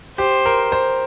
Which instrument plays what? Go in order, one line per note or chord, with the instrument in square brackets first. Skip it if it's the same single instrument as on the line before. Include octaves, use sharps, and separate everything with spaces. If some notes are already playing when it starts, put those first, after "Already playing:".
[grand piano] G4 [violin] C5
[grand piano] A#4
C5